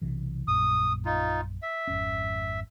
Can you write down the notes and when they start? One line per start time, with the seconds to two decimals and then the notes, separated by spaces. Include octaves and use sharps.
0.02 B1 C3 E3
0.48 A#1 F#2 A#2 D#6
1.05 D#4 F4
1.62 E5
1.87 G#1 F2 C#4